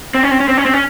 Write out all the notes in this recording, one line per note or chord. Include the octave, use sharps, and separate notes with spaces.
C4
C#4
C4
C#4
C4
C#4
C4
C#4